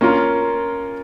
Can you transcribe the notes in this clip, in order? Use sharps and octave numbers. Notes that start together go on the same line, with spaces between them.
A#3 C#4 F4 A#4